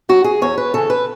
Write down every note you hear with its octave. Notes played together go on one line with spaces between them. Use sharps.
F#3 F#4
G#4
E2 C#5
B4
C#3 E3 A4
B4